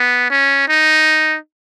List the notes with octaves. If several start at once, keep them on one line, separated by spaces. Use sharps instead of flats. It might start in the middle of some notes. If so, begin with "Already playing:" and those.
Already playing: B3
C#4
D#4